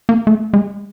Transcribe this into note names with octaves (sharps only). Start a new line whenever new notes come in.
A#3
A3
G#3